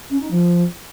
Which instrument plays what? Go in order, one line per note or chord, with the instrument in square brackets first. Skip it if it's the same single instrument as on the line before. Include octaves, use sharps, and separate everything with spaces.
[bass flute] C#4
D#4
F3